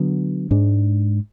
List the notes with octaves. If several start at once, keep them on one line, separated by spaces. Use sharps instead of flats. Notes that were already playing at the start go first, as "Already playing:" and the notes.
Already playing: D3 F#3 B3
G#2 G#3 D4